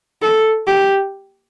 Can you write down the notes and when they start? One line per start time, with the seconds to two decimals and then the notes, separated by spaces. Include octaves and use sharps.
0.22 A4
0.67 G4